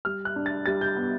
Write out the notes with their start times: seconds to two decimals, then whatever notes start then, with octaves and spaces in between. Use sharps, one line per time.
0.05 G3 F6
0.25 F#6
0.36 D4
0.46 A6
0.66 G3 A6
0.81 G6
0.96 B3